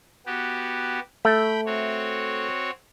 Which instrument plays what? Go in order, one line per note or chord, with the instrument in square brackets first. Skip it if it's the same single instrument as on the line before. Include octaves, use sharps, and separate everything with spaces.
[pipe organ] B3 F#4 G4
[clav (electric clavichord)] A3 [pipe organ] G5 B5
[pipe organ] C4 F#4 C#5